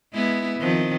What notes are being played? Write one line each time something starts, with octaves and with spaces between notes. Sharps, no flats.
G#3 B3 E4
D#3 F3 C4